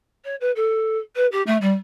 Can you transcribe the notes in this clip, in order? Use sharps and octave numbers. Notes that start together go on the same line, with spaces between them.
C#5
B4
A4
B4
G4
A3
G3